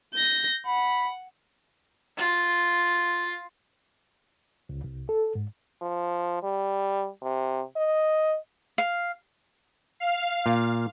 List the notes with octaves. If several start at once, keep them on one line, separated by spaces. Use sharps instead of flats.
G6 A#6
F#5 B5
F4
C#2
C2
A4
G#2
F3
G3
C3
D#5
F5
F5
A#2